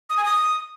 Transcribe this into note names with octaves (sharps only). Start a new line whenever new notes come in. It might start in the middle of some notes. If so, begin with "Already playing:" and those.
D#6
G#5
D#6